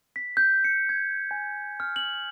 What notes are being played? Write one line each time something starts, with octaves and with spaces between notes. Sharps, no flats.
B6
G6
C#7
G#6
G#5
F6
F#7